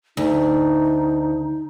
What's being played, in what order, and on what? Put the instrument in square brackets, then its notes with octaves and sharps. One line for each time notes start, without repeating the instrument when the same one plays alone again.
[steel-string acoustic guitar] D2 [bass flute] D#4